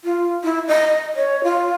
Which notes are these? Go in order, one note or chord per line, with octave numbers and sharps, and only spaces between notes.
F4
E4
D#5
C#5
F4